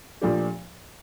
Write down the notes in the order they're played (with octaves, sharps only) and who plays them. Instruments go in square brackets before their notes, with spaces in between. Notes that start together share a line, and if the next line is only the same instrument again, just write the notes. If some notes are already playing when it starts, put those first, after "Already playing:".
[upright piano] A#2 F3 A3 D4 G4